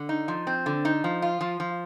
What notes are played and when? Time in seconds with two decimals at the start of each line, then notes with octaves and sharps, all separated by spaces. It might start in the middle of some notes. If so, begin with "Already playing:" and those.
Already playing: D3
0.09 D#4
0.28 F3
0.47 C4
0.66 D3
0.85 D#4
1.04 F3
1.22 F4
1.41 F3
1.60 F3